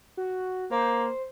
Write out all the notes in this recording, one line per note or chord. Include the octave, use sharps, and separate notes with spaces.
F#4
A#3 C5